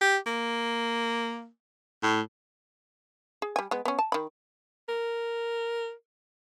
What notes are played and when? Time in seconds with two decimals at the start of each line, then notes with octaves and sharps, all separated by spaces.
0.01 G4
0.26 A#3
2.03 A2
3.42 G#4
3.56 G3 G#5
3.71 G#3 B3
3.85 B3 C#4
3.99 A5
4.12 D#3 B5
4.89 A#4